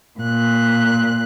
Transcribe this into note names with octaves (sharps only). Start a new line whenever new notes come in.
A#2 F#6